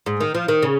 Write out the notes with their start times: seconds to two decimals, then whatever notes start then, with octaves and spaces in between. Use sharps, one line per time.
0.06 G#2
0.20 D#3
0.35 F3
0.48 D#3
0.63 C#3